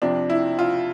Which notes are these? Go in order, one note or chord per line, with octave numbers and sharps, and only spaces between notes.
F2 C3 F3 D4
E4
F4